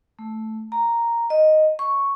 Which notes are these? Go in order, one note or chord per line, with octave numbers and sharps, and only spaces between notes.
A3
A#5
D#5
C#6